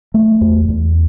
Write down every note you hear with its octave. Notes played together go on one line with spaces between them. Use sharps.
A3
E2
E2